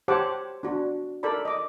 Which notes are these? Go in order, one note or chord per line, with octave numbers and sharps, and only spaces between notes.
G4 C5 C#5 F#5 A5 D6
D4 F#4
A4 A#4 D5 B5
D#5 D6